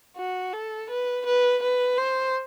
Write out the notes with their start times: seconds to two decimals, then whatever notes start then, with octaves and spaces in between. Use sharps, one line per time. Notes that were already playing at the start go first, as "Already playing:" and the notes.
0.17 F#4
0.53 A4
0.90 B4
1.26 B4
1.63 B4
1.98 C5